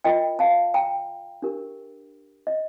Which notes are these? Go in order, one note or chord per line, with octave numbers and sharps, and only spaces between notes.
F4 A#4 D#5 G5
F5 A5
G5 A#5
D4 G4 A#4
D#5